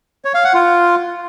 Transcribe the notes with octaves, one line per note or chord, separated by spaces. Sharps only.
C#5
F5
F#5
F4